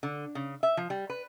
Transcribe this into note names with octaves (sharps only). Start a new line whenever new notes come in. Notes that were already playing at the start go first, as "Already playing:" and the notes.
D3
C#3
E5
F3
G3
B4